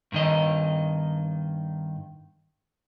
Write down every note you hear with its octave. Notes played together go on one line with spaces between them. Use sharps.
G2 D#3 D#5